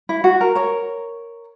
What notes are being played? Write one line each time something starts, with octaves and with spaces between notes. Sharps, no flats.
E4
F#4
A#4
A#4 C#5